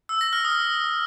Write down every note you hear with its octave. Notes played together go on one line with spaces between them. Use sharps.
E6
A#6
F6
D#6